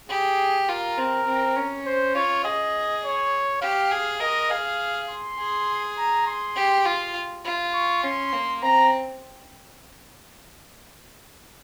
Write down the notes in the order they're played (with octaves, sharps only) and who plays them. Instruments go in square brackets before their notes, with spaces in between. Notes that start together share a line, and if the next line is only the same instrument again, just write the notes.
[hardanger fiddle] G4 [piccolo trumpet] G#4
[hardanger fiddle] F4 [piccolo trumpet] A#4
[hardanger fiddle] C4
C4
C#4
[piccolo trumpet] C5
[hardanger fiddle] F4 [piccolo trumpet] C#5
[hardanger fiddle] G#4 [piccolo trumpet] D#5
[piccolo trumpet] C#5
[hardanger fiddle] G4 [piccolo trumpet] F5
[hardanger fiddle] G#4
[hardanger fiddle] A#4 [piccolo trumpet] D#5
[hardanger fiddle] G#4 [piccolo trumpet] F5
[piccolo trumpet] C6
[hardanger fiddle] G#4
[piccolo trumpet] A#5
C6
[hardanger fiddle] G4
[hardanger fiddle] F4 [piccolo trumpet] C6
[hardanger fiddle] F4
[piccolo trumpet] C#6
[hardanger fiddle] C#4 [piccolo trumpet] C6
[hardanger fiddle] A#3
[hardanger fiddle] C4 [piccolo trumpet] A#5